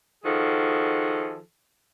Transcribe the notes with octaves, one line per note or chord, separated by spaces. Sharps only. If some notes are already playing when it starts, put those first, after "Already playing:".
D#3 F3 F#4 G#4 A4